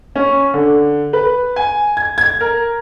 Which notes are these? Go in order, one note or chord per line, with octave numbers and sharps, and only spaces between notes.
C#4
D3
B4
G#5
G#6
G#6
A#4